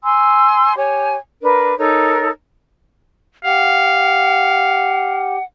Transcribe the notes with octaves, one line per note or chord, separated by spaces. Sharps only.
G#5 C6 E6
G4 C#5 G#5
D4 A#4 B4
D#4 A4 A#4 C#5
G4 F5 F#5